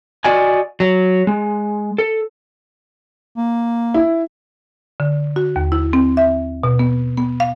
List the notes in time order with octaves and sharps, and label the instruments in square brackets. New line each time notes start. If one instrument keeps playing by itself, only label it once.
[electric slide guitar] F#4 D5 D#5 G#5
F#3
G#3
A4
[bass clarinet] A#3
[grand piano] E4
[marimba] D3
F#4
D#2
E4
C4
E5
B2
B3
B3
F5